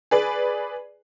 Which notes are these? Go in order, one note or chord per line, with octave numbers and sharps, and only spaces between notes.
G#4 B4 D5